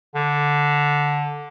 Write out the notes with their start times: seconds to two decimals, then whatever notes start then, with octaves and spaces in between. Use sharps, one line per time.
0.15 D3